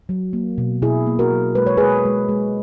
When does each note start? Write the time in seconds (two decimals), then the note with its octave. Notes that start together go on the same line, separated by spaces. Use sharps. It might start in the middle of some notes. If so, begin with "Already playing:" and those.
0.09 F#3
0.33 A#3
0.58 B2
0.82 B2 E4 G#4
1.07 A#3
1.19 F#4 A#4
1.32 F#3
1.55 G#3 B4
1.67 C#5
1.77 G#3 G#4 B4
2.05 G#3
2.29 G#3